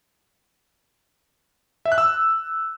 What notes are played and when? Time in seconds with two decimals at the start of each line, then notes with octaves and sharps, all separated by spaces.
1.85 E5
1.92 F#6
1.98 E6